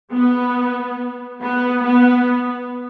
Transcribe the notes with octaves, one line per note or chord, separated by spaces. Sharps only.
B3
B3
B3